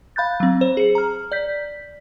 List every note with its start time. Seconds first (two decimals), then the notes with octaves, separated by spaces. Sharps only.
0.16 F5 B5 F#6 G6 A6
0.40 F#3 C4
0.61 C5
0.77 G#4 C#7
0.95 A#5 F6
1.32 D5 G6 B6